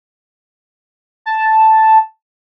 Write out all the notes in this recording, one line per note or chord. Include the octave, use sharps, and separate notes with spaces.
A5